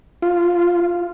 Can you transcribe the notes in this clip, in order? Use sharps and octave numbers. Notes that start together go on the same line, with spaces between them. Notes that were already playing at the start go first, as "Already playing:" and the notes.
F4